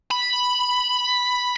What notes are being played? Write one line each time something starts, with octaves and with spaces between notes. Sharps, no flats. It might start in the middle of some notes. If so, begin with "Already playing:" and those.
B5